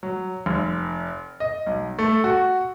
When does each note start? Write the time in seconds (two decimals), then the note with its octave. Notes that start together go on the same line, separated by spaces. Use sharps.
0.03 F#3
0.46 F1
1.40 D#5
1.67 B1
1.99 A3
2.24 F#4